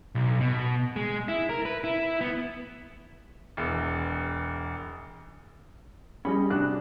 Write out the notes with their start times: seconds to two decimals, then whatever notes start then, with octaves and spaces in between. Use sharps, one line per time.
0.15 B1
0.41 B2
0.96 G#3
1.28 E4
1.49 A#4
1.65 B4
1.84 E4
2.21 B3
3.57 E1 E2
6.25 G3 C#4 G#4 D#5 B5
6.50 G2 C3 D4 F#4 F#6